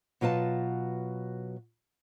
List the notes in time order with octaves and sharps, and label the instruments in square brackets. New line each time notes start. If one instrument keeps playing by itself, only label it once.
[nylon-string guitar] B2 F#3 F4 B4 A5